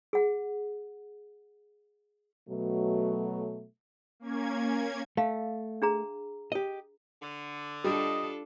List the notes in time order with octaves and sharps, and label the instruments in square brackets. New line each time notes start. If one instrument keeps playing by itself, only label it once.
[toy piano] G#4 F#5
[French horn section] B2 F#3 A3
[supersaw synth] A#3 C#4 G#6
[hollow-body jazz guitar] A3 [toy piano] F5
[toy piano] D4 G#4 A#5
[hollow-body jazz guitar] G4 D#5
[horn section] D3
[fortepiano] G3 [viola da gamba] D4 F4 A4 [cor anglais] D#5